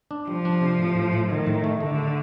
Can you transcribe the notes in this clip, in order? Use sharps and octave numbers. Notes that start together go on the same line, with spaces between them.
D4
F3 G3
D4
C3
A2
A2
A2
A2 D#3
A2
A3
D3 A3
A3